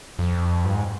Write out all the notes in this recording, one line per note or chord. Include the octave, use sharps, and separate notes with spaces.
F2
G2
G#2